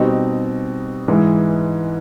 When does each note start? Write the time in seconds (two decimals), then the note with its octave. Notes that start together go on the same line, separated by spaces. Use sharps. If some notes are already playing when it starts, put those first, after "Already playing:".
Already playing: B2 G3 C4 D#4
1.08 G#2 E3 G#3